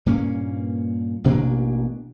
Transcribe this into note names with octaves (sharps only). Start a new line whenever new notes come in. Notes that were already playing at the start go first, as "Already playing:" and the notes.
G2 A#2 A#3 C#4
A1 B2 A#3 D4